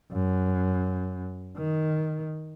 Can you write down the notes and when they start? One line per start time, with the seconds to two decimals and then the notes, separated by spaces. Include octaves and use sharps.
0.12 F#2
1.57 D#3